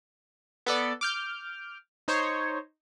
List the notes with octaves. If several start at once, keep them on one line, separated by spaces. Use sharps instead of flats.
B3 A4 D5
D6 F6 G6
D#4 C5 C#5